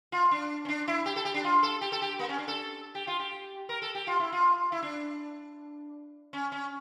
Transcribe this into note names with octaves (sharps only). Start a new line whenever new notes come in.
F4
D4
C#4
D4
E4
G4
A4
G4
D4
F4
A4
G4
A4
G4
A#3
C#4
D4
A4
G4
F4
G4
A#4
A4
G4
F4
E4
F4
E4
D4
C#4
C#4